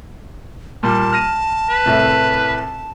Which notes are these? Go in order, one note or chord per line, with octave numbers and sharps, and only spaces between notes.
A#2 G3 A#3 A5
F6 A#6 D#7
B4
C2 A2 E5